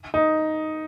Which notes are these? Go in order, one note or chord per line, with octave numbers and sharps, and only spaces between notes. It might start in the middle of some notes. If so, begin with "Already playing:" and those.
D#4